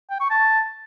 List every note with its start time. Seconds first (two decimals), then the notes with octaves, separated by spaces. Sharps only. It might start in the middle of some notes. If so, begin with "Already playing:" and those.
0.10 G5
0.20 C#6
0.30 A5